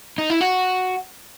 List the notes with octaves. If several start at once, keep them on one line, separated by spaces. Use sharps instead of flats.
D#4
E4
F#4